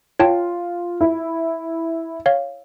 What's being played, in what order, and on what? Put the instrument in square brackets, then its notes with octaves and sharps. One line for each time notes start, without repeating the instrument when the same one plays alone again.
[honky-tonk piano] F4 [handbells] C#5 G5 A5
[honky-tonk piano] E4
[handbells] C#5 F5